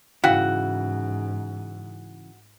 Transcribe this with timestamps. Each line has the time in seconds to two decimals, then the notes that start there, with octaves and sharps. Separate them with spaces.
0.24 G#2 C#3 E3 E4 F#4 F5 G5 F#6